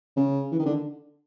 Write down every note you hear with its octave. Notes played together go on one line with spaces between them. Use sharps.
C#3
E3
D#3
D3